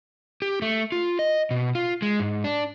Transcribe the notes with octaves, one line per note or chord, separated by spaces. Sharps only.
G4
A3
F4
D#5
B2
F4
G#3
G#2
D4